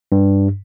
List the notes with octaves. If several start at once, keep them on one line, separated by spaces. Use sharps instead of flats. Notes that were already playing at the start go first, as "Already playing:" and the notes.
G2